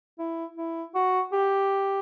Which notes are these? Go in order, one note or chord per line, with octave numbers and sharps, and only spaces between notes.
E4
E4
F#4
G4